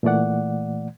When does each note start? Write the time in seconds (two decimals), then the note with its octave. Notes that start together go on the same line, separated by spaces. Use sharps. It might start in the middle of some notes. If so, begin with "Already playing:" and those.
0.03 A#2 E3 A3 D5 F#5